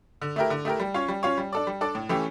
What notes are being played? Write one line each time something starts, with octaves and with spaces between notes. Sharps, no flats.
D3
A3 E4 G4 A#4
D3
A3 E4 G4 A#4
G3
C#4 F4 C#5
G3
C#4 F4 C#5
G3
D4 A4 D5
G3
D4 A4 D5
A2
E3 A3 C#4 G4